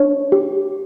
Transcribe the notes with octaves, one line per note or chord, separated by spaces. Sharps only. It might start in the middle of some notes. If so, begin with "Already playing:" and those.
Already playing: D4 C#5
G4